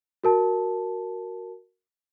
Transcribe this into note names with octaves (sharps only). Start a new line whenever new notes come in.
F#4 A#4 A5